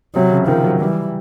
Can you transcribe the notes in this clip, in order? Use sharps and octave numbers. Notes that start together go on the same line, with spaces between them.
C3 F#3
C#3
D#3 F3
F#3
E3 G3